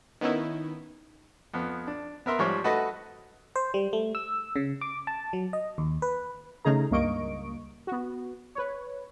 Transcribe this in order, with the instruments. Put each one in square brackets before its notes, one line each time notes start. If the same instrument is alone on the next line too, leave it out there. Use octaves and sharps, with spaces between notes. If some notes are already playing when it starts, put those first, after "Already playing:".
[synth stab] D#3 B3 C#4 D#4 E4
[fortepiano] F2 B3
D4
B3 A#4 E5 C6
G#2 F3 G3 C#5 C#6
A3 F#4 A4 B4 D#5 F#5
[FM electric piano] C5
G3
A3
E6
C#3
D6
A5
F#3
D#5
D#2
B4
[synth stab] C#3 A3 D#4 G#4 A#5
C#2 G2 A#3 D#5 C#6 D7
B3 F#4
B4 C#5